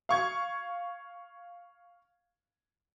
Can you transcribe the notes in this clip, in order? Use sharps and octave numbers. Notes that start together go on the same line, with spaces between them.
F5 C#6 G#6